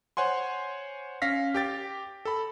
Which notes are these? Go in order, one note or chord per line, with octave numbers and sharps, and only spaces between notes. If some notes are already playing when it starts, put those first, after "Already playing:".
C5 C#5 F#5 G#5 C6
C#4 F5 A#6 B6
G4 G5 A6
A4 B5